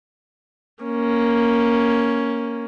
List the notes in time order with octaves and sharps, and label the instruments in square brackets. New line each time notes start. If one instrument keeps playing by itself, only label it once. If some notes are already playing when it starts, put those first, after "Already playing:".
[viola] A#3 C#4